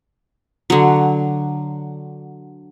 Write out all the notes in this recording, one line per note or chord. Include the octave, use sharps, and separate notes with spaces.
D3 F#3